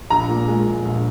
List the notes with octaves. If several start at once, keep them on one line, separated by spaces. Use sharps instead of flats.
A#1 A#5
A#2
G#3
A#1
A#1